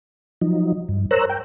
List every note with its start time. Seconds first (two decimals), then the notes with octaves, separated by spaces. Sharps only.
0.41 F3 F#3 D#4
0.89 G2
1.11 A#4 C5 C#5 A#5 E6 F#6
1.29 G5